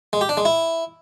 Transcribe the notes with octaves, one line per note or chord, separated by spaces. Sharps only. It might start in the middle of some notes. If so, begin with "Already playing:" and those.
G#3
G4
D4
G#3
E4